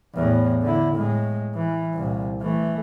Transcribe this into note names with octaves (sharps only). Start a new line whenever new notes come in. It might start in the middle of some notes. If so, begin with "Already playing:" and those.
E2 A2
D3 E4
A2 G#3
E3
C2 A#2
E3 A3